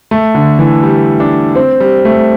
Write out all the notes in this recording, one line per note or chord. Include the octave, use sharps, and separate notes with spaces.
A3
D3
E3
G3
D4
C4
G3
A3